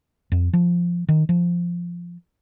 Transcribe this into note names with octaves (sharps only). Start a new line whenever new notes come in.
F2
F3
D#3
F3